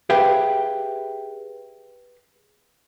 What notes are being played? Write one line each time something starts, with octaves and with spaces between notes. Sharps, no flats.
G4 G#4 B4 E5 F5 G5